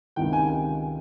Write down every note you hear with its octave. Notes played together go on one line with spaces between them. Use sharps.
C#2 C3 D#3 G5
G#5